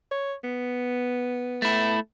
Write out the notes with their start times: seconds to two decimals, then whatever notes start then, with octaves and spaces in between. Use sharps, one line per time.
0.11 C#5
0.44 B3
1.62 A3 E4